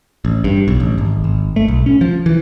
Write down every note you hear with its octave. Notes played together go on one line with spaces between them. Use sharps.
A1
G2
B1
A1
G#1
G#1
A3
B1
C#4
F3
E3